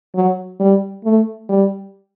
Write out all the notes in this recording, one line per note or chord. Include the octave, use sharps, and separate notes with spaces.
F#3
G3
A3
G3